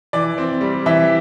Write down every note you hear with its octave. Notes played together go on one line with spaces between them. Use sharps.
E3 D5
C4
G3
E3 E5